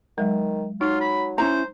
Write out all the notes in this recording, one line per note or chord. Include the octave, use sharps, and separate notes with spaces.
D#3 F#3 G#3
F#3 D#4 F4
B5
C#4 E4 C5 A#5